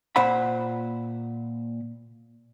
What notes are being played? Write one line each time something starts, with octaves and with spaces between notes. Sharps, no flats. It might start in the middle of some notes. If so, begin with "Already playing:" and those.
A#2 C5 F#5 B5